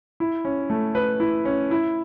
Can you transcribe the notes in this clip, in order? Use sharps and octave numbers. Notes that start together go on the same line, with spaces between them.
E4
C#4
A3
B4
E4
C#4
E4